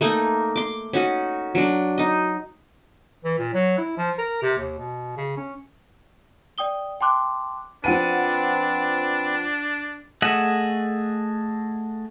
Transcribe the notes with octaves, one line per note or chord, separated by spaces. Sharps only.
A3 A#3 D#4
C6 D6
C#4 D#4 F#4
F#3 D4
D#4 D#5
E3
A#2
F#3
E4
F3
A#4
C3
D#2
B2
C#3
C#4
D5 G5 D#6 G7
G5 A5 C6 D6 F#6
F3 C4 D4 B4 F#5 D#7
A3 G#4 D#5 E5 F#5